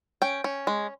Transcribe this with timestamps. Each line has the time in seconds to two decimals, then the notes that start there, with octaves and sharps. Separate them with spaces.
0.22 C#4 G5
0.44 C#4
0.67 G#3